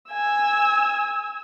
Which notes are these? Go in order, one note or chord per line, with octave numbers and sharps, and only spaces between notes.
G#5 E6